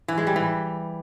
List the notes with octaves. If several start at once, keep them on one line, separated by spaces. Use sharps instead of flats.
E3
G#3
G3
E3